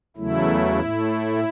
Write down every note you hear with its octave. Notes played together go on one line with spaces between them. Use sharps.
E2 C#3 F#3 A3 E4
A2 A3